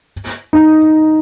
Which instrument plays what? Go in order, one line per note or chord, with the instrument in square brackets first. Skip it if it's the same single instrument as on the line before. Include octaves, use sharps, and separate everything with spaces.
[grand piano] D#4